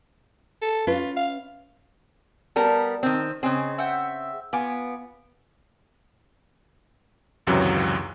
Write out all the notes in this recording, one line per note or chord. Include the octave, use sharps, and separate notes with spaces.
A4
C#4 F4 B4
F5
G3 B3 A#4 A5
D#3 C4
C#3 C4 G#4 D#5
E5 F#5 G5
B3 F4 G#5 D6
G#1 C#2 F#2 C3 E3 F#3